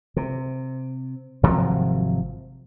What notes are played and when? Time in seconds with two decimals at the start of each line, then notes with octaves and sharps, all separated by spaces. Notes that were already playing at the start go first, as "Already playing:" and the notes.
0.17 C3
1.43 G#1 C3 F3 F#3